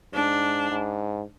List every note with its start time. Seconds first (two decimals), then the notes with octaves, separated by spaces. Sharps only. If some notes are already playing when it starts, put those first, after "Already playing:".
0.13 G#2 D4
0.71 G#2